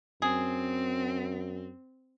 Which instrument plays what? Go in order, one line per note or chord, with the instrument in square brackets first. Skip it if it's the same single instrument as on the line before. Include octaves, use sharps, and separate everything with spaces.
[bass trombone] F#2 [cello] C4 [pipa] G#4